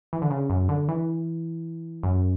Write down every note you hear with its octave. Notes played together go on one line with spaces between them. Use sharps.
E3
D3
C#3
F#2
D3
E3
F#2